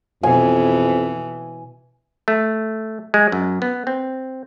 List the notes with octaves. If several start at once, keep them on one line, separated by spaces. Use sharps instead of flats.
F2 B2 E3 G#5
A3
G#3
F#2
B3
C4